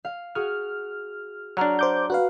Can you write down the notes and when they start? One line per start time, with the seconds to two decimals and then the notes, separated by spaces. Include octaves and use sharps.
0.05 F5
0.35 F#4 G#4 F6
1.57 F#3 D4 F#5 A#5 F6
1.79 C5 D6 G6
2.10 F#4 B4 F5 F#6